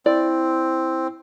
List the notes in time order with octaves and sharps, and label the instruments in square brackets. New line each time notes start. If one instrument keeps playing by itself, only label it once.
[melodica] C4 [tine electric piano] E4 [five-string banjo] D5